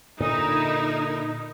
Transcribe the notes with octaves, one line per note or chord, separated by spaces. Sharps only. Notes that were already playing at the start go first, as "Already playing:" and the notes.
A#2 D3 D#4 E4 A#4